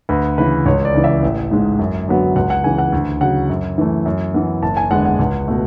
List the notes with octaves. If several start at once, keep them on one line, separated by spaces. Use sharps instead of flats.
D2 B4
C#3 E3 B4
C#2 C#5
D5
C#3 E3
E5
A1
G#2 G#3
F#2
D3 F#3 B3
C#2 F#5
F#5
C#3 E3 G#5
F#5
D2
C#3 F#3 F#5
F#2
E3 A3
F#2
E3 B3
F#1 A5
G#5
E2 D3 G#3 B3 F#5
F#5
C#2
B2 A3